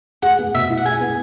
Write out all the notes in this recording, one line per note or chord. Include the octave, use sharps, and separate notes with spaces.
G#4 F#5
B3
B2 E5
E4
F#5
G#4 G#5
B3